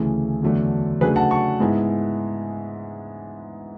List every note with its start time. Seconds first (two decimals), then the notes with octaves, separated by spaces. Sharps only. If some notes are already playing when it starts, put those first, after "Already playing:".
Already playing: D2 C#3 E3 A3 G#4
0.42 E2 D3 F#3 A3 D4
1.01 C#3 F#3 A3 D4 G#4 B4
1.16 F#5 A5
1.31 A5 C#6
1.60 G#2 G#3 B3 E4